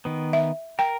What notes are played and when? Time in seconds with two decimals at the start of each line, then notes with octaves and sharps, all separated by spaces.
0.05 D#3 B3
0.33 E5
0.79 A#4 G5